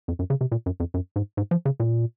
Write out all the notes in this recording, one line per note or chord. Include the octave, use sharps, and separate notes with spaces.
F2
F#2
C#3
C3
A#2
F#2
F2
F#2
G#2
G#2
F3
C#3
A#2